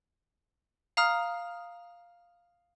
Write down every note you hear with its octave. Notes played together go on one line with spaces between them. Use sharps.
F5 A#5 D#6 F6